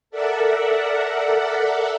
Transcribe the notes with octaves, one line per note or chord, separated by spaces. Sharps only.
A4 A#4 D5 E5 F#5